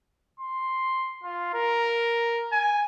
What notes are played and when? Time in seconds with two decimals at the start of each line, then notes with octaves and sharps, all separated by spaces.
0.40 C6
1.23 F4
1.54 A#4
2.52 G#5